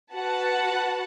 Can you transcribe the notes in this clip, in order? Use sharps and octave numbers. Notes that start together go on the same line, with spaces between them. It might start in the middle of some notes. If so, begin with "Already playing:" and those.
F#4 B4 F#5 A5